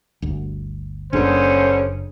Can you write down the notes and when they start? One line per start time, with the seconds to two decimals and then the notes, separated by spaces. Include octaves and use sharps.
0.22 G1 D2
1.13 F#1 G2 D3 C#4 D4 G#4 C5